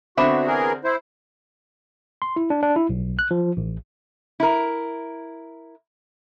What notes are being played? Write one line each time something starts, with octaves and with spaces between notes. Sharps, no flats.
D3 B3 C4 D4 F#4 E5
E3 G#4 A#4
E4 C5
C6
E4
D4
D4
E4
B1
F#6
F3
A1
E4 A#4